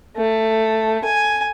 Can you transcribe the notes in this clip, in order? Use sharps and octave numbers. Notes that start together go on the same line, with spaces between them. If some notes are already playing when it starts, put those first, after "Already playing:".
A3
G#5